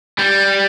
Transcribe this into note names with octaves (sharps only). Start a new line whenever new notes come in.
G3